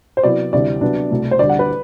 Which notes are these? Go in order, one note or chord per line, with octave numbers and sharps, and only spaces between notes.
C5
C3 F#3 B3 E4 D5
D2 C3 E3 G3 D5
C3 F#3 B3 D4
C2 B2 A3
C5
D2 D3 G3 D5
F#5
B4